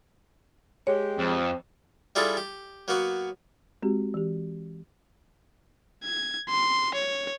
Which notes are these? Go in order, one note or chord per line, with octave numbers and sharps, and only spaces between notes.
G#3 G4 C#5
F2 C4
G3 D4 E4 F4 G#4 A4
G4
F#3 A#3 B3 F#4
G#3 C4 F#4 G4
E3 G4
G#6
C6
C#5